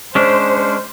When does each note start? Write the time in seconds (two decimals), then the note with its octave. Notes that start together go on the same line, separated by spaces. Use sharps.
0.15 G#3 C#4 D4 C5